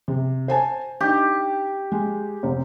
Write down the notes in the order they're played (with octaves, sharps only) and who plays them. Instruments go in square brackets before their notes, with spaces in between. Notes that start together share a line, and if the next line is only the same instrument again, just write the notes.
[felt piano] C3
C5 G#5 A5
[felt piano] D4 D#4 [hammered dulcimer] G4
[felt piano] G#3
F1